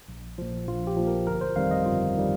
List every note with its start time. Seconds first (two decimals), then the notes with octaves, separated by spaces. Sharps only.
0.08 A#1
0.38 A#2 F3
0.67 A#1 F4
0.87 G4
0.97 A#2 F3
1.07 A#4
1.27 G1 A#4
1.41 C5
1.56 F2 D#3 G3 F5
1.71 D#5
1.86 G1 F4
2.17 D#3 G3